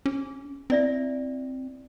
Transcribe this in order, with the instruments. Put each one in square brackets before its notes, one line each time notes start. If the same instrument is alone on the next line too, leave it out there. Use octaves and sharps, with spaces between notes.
[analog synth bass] C#4 [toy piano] G#4
[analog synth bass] C4 [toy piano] E4 D5 E5